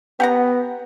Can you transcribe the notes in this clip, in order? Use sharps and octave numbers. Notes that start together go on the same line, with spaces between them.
B3 G4 F#5 A#5